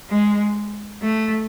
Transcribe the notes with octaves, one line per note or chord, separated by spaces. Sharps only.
G#3
A3